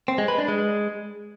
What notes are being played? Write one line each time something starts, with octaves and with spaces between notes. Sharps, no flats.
C4
G#3
B4
D4
G#3